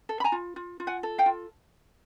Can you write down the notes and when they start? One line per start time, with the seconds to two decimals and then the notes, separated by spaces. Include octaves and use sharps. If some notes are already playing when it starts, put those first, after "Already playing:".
0.09 A4
0.20 B5
0.24 G#5 A#5
0.32 F4
0.56 F4
0.80 F4
0.87 F#5 G#5
1.03 A4
1.18 F5 G5
1.26 F4